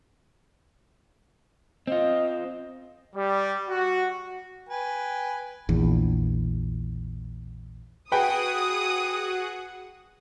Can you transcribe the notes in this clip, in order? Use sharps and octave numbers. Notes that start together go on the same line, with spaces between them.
C4 F4 D#5
G3
F#4
B4 G5 G#5
A#1 E2
F#4 G#4 B4 F#5 G5 D#6